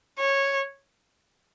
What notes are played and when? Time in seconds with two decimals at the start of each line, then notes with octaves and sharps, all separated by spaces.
0.19 C#5